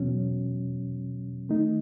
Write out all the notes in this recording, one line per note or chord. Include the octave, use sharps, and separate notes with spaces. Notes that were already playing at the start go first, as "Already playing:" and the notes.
Already playing: E2 B2 F#3 C#4
D#3 A3 D#4